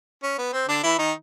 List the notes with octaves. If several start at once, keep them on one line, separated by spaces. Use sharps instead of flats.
C#4
B3
C4
D3 D4
E3 E4
D#3 D#4